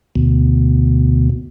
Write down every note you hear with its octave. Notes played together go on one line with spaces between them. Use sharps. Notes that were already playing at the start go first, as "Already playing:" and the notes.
D2 B2